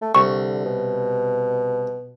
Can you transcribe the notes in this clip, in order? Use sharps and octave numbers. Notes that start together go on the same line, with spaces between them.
A3
C2 D3 C#6
B2